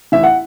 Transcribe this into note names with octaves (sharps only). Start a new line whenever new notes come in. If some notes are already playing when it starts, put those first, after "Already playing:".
A1 E5
F#5